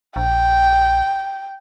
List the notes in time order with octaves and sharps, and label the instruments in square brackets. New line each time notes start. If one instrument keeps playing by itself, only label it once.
[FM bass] A#1 [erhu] G5